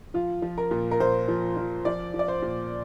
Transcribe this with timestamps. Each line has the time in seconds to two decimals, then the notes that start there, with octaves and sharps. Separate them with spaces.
0.14 F3 F4
0.42 F3
0.58 A#4
0.71 A#2
0.91 A#4
1.00 A#2 C5
1.28 F3
1.57 F3
1.85 F3 D5
2.14 F3
2.19 D5
2.28 C5
2.42 A#2